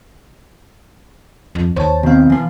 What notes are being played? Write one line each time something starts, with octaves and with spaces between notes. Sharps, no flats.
F2
D#2 C5 C#5 A5
B2 D#3 C4 F5
E3 C6